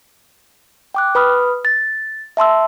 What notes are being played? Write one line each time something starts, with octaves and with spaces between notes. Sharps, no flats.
G5 D6 F#6
B4 B5 D#6 F6
A6
E5 A5 C6 E6